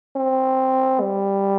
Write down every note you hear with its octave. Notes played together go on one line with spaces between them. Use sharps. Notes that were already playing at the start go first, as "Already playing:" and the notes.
C4
G3